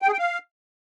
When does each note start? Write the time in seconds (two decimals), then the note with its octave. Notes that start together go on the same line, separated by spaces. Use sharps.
0.02 G5
0.08 G#4
0.13 G5
0.18 F5